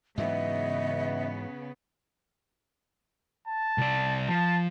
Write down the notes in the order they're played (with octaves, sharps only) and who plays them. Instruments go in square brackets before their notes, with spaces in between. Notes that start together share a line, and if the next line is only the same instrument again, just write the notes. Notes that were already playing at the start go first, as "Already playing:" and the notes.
[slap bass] G#2 E3 F#3 [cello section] C#3 B3 [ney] D#5 [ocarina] E5
[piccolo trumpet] A5
[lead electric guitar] C2 D5
[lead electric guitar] F3 [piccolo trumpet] A5